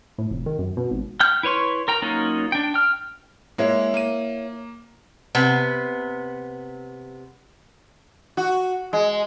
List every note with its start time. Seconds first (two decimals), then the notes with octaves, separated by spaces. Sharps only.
0.18 A2
0.31 F1
0.46 D#3
0.58 F#2
0.77 B2
0.91 G#1
1.20 G5 F6 G6
1.43 E4 B4 C#5 C6 C#6
1.88 A#4 G5 A#5
2.02 F#3 A#3 C#4 D#4 F4
2.52 D4 G5
2.74 G5 F6
3.58 G#3 A#3 E4 C#5 E5
3.94 A#3 D#7
5.35 C3 B3
8.37 F#4
8.93 G#3